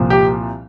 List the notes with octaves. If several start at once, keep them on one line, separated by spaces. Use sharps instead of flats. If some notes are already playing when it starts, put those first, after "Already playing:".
Already playing: C2 A#2 F3
G4